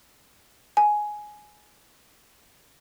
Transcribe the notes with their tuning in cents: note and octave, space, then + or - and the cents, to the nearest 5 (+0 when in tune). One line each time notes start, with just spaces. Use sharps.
G#5 +10